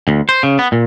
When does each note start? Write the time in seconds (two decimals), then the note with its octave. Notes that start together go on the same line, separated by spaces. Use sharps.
0.08 D2
0.29 C5
0.43 C#3
0.59 B3
0.72 A#2